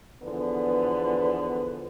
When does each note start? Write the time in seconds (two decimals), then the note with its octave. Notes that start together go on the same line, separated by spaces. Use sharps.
0.23 E2 D3 F3 B3 B4